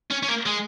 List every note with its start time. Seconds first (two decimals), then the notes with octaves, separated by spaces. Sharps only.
0.11 C#4
0.23 C#4
0.28 A#3
0.46 G#3